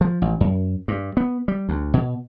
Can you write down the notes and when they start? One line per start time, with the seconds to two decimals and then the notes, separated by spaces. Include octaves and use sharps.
0.01 F3
0.22 A1
0.40 F#2
0.88 G2
1.17 B3
1.48 G3
1.69 D2
1.94 B2